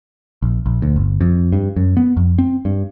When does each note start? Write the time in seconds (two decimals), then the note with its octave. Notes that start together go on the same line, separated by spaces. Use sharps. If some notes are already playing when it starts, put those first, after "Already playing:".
0.42 A#1
0.66 A#1
0.82 D2
0.96 G1
1.21 F2
1.52 G2
1.76 F#2
1.97 B3
2.17 F2
2.38 C4
2.65 G2